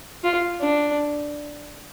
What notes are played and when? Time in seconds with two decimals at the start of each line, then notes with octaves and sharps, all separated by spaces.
0.24 F4
0.61 D4